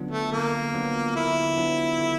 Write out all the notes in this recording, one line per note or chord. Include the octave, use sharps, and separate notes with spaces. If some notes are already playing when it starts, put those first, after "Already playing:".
Already playing: D3 F#3 B3 D4 F4
A3
D3 A#3
F#3 B3 D4 F4
D3 E4
F#3 B3 D4 F4
D3